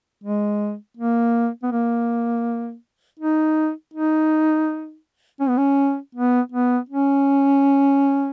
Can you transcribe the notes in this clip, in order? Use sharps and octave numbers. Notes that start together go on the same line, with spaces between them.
G#3
A#3
B3
A#3
D#4
D#4
C#4
B3
C#4
B3
B3
C#4